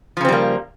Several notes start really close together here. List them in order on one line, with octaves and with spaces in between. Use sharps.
F3 C#3 C4 G3 A#3